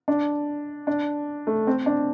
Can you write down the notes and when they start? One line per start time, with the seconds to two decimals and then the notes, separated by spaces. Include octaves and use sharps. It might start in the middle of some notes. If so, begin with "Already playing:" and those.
0.08 D4
0.87 D4
1.47 A3
1.67 C4
1.86 D4